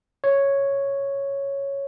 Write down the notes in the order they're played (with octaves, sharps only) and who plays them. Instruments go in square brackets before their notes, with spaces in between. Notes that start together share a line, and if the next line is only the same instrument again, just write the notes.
[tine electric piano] C#5